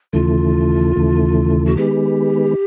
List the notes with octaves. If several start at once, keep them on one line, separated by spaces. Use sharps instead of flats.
D#2 C#3 E3 A3 F4
D#2 C#3 E3 A3
F#4
D#3 G#3 B3 G4